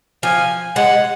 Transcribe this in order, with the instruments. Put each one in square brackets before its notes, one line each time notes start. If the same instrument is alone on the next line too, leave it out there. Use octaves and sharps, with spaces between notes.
[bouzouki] F3 [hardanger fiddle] G#5
[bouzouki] G#3 [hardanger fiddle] F#5